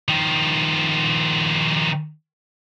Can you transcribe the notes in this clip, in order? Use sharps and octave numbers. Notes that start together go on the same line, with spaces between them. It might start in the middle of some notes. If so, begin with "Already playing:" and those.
D#3 F3